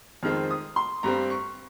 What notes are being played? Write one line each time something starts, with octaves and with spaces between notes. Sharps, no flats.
F2 D#3 G#3 C4 F6
D#6
C6
G2 G3 C4 A#5
C#6